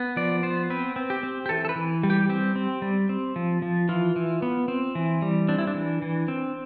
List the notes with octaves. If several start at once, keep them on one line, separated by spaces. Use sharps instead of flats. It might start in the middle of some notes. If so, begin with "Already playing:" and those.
Already playing: B3
F3 D5
B3 C5
C4 B4
C4
G4
C4
G4
E3 A4
A4
B4
E3
G3
G4
C4 G4
C4
G3
C4
F3
F3
E3 F4
E3
B3
C4
E3
G3
C4 D4
E4
D4
E3
E3
C4